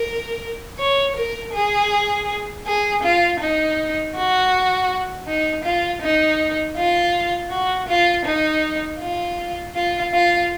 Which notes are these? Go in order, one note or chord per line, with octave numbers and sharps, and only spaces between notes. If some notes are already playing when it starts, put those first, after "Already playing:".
Already playing: A#4
C#5
A#4
G#4
G#4
F4
D#4
F#4
D#4
F4
D#4
F4
F#4
F4
D#4
F4
F4
F4